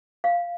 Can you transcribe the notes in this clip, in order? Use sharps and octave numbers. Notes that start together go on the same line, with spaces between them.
F5